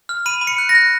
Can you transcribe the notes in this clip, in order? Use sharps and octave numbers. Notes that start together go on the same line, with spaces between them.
F6
B5 D#7
B5
C#7
F#6
A#6
F#6